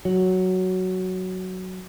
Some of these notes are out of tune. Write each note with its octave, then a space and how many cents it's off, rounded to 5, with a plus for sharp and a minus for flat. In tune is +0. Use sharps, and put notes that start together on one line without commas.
F#3 +5